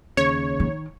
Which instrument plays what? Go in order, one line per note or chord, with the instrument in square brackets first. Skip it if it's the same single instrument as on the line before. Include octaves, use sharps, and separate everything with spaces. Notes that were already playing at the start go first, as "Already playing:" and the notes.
[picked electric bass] D#2 C#3 [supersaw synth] C#5
[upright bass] D#3